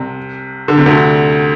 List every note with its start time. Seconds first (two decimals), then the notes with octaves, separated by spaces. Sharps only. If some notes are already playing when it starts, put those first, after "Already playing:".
Already playing: C2 C3
0.68 D3
0.78 C3
0.86 D2 D3